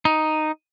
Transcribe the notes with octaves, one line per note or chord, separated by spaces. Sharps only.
D#4